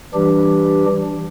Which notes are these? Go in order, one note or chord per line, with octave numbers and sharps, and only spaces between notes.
E3 G3 D4 G4